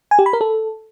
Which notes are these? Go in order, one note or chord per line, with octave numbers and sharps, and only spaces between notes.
G#5
G4
B5
A#4
A4